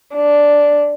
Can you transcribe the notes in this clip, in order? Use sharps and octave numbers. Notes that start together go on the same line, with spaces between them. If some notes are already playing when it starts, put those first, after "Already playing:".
D4